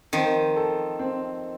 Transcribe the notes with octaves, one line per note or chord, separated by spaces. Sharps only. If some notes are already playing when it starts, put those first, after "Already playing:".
D#3 F3 C4
A4
C4